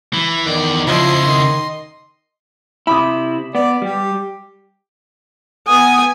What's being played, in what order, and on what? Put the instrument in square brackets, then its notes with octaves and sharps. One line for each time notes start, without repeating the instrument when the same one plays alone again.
[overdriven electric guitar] E3
[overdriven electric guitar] E2 D5 [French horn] D#3
[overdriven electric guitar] C#3 E4 [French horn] F3 [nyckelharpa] D#5 C6
[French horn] D#3
[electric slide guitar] C3 E4 [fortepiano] B5 D6 D#6
[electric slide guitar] B3 [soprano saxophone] D5
[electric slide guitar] G3 [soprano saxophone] G4
[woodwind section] B3 D#6 [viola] G#5